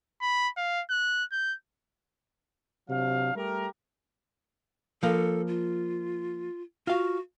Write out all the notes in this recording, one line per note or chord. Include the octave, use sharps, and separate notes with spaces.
B5
F5
F#6
G6
C3 F#3 D4 F5
G3 A3 G4 A#4
F3 A#3 A4
F4
F4 F#4 F5